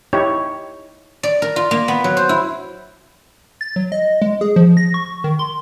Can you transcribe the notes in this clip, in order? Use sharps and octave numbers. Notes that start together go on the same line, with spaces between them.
D#4 E4 G4 C#5
D5
A#4
F4
A#3
B3
F#3
C5
E4
A6
F#3
D#5
G#3
G#4
F3
A#6
C#6
D#3
C6